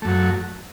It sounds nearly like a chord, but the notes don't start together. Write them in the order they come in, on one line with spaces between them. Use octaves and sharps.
A3 F#2 F#3